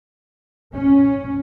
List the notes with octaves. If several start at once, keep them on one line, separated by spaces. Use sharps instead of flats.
C#4